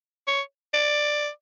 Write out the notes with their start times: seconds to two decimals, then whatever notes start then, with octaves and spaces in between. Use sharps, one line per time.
0.27 C#5
0.74 D5